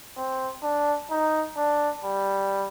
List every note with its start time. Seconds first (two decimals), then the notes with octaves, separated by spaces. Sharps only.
0.17 C4
0.63 D4
1.11 D#4
1.57 D4
2.04 G3